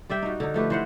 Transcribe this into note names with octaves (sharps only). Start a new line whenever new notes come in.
G3 D5 E5 G5
D#4 F#4
D3 D#4
F3 A3 G4 B4
E3 C5 F#5